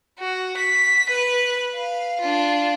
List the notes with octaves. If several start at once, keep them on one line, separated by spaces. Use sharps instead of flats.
F#4
B6
B4
F5
D4 F4